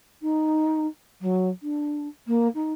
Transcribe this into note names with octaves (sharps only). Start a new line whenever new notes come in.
D#4
F#3
D4
A#3
D#4